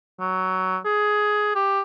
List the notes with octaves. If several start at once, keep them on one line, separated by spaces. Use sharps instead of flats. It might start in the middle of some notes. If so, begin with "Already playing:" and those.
F#3
G#4
G4